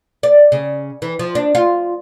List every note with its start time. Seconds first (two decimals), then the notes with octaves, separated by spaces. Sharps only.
0.23 D5
0.52 C#3
1.02 E3
1.19 F3
1.35 D4
1.55 F4